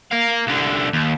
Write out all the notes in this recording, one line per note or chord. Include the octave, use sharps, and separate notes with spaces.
A#4 F5
C2 D3
D#2